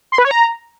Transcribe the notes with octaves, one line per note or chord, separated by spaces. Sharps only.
C6
B4
C#5
A#5